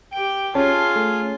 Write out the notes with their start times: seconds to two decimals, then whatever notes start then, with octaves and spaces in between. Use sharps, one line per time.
0.13 G4 G5 D7
0.55 C#4 F4 G#4 A5
0.96 A3